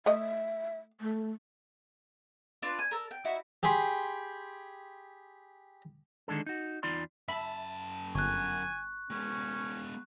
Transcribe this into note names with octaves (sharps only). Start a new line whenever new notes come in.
A3 D#5 E5
A3
D4 F4 B4
G#5
A4 A#4
G5
D#4 E4 F#4
G4 G#4 G5 B5 C6
D3 D#3 G#3 D4 A4
D#4 F#4
E2 D#4 F4 D5 B5 C6
F#2 E5 A5 B5
G1 G#5 C#6 F#6
G#3 B3 C#4